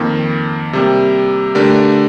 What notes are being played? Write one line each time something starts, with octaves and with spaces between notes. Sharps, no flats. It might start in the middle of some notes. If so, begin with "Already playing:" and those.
Already playing: F2 D#3 A#3
C3 G3 A#3
D3 A3 D4 G4 A#4